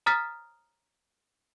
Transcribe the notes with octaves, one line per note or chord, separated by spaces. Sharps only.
A#5 D#6 F6 A6 B6